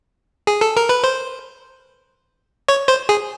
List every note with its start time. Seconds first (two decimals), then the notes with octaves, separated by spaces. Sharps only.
0.47 G#4
0.61 A4
0.76 A#4
0.89 B4
1.04 C5
2.68 C#5
2.88 C5
3.09 G#4